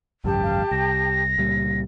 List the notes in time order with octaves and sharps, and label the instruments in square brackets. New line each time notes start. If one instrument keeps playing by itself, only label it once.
[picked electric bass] G#1 C#2 F#2 [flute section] G4 G5 A5
[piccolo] F5
[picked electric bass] C2 [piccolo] A#6
[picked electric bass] C#2 A#2 G3